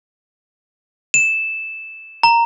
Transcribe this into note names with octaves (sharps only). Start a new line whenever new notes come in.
E7
A#5